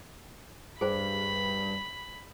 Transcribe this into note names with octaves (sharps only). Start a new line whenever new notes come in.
G2 G#4 C5 B5